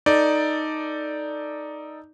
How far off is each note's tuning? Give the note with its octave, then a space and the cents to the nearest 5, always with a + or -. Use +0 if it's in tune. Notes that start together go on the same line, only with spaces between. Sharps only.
D#4 +0 A4 +5 D5 +0